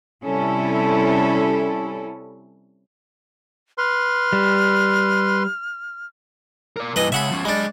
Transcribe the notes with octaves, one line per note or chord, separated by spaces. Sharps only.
C3 G3 C#4 E4 A4
B4 C6 F6
G3
A#4 D5
G2 E3 B4 D#5
C#3 G#3 E5 F#5 B5
F3 C#4
G#3 D4 D5 B5